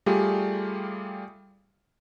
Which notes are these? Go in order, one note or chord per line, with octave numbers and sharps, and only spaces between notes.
G3 A3 F4 G4 G#4